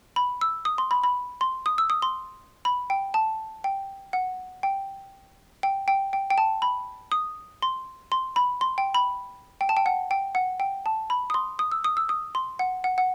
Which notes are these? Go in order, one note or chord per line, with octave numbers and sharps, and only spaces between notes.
B5
E6
D#6
C6
B5
B5
C6
D#6
E6
D#6
C6
B5
G5
A5
G5
F#5
G5
G5
G5
G5
G5
A5
B5
D#6
C6
C6
B5
C6
G5
B5
G5
A5
G5
F#5
G5
F#5
G5
A5
B5
D#6
C6
D#6
E6
D#6
E6
D#6
C6
F#5
F#5
F#5